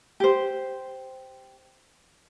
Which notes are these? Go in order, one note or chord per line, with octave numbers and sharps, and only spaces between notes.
G4 C5